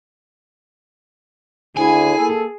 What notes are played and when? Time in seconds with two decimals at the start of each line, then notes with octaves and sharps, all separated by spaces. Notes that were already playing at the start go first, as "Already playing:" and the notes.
1.77 D2 D3 E4 G#4 G#5
2.17 A#3 A4